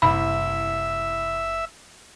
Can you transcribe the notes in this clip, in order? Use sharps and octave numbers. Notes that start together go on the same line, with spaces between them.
F#1 C2 E4 E5 B5